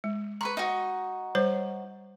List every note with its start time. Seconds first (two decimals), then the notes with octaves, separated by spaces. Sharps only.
0.04 G#3
0.41 B4 A#5 B5 C#6
0.57 D#4 F#4
1.35 G3 C5 C#5